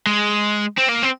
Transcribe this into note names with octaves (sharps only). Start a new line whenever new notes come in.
G#3
C4
A#3
C4